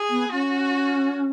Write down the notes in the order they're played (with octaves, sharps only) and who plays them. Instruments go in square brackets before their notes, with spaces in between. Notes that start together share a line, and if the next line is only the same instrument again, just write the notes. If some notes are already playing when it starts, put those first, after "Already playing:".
Already playing: [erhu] G#4
[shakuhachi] B3
[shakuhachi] C#4 [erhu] F#4